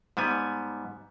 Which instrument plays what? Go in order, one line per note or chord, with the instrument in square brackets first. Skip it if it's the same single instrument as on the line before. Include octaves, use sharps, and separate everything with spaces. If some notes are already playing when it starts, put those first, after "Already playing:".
[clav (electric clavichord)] G#2 G3 B3 G#5